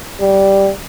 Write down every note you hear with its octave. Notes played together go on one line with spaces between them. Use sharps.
G3